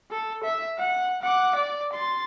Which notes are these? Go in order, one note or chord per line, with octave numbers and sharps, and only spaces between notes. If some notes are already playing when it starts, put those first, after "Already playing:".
A4
E5
F#5
F#5 D6
D5
C6 A6